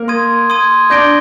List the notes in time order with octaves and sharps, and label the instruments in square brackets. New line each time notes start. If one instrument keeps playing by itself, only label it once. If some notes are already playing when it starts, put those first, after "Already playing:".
Already playing: [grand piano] A#3 A#4
[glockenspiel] C6 D#6 G#6 D#7
C6 D#6 G#6 D#7
[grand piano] D4 D5 [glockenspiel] G6 A#6 D7 G7